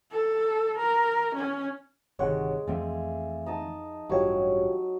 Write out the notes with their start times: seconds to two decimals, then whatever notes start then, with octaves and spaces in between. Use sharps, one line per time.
0.12 A4
0.78 A#4
1.35 C#4
2.19 G1 C3 D#3 G#3 C#5 F#5
2.67 F2 E3 A3 C4 E5 F5 G#5
3.46 D#4 D#5 A5
4.10 A1 G2 F#3 F4 G4 C#5